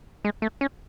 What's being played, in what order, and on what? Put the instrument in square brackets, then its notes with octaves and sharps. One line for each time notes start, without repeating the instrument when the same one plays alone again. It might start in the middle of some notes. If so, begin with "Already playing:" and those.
[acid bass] G#3
A3
C#4